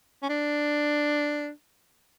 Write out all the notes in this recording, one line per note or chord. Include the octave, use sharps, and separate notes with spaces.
C#4
D4